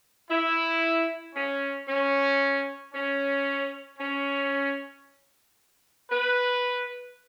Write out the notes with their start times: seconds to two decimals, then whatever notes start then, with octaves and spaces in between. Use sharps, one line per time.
0.30 E4
1.35 C#4
1.88 C#4
2.94 C#4
3.99 C#4
6.10 B4